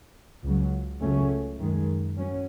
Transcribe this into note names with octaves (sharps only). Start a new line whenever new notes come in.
C#2 C#3 F#3
C#2 C#3 F#3 A3 C#4
F#2 D#3 G#3
F#3 C#4